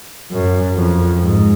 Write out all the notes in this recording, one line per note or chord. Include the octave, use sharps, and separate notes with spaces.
F#2
F2
G#2